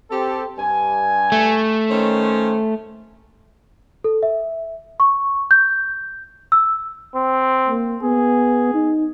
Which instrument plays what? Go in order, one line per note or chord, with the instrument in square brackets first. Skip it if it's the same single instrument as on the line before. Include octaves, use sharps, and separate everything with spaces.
[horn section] C4 G4 A4
G2 G#5
[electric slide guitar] A3
[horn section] D#3 C#4 C5
[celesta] A4
E5
C#6
G6
E6
[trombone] C4
[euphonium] A#3
[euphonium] B3 [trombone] G#4
[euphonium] D#4